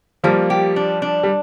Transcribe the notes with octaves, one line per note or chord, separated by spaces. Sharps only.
F3 G3 A#3
G4
D4
D4
G3